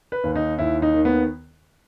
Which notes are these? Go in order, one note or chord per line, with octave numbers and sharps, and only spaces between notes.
B4
D#2
D#4
D#2 E4
D#4
D#3
B3